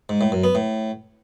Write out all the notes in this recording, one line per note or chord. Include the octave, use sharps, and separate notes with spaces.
G#2
A2
F#2
B3
A2